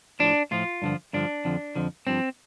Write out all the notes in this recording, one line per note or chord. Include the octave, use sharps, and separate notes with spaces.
A2 F3 D4
A2 F3 F4
G2 D3 F3
G2 D3 F3 D4
F2 D3 F3
F2 D3 F3
G2 F3 C4